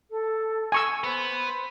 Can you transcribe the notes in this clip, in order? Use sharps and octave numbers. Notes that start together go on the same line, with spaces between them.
A4
G#5 C#6 E6
B3 C5 B5